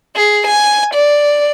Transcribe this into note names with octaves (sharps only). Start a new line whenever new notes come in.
G#4
G#5
D5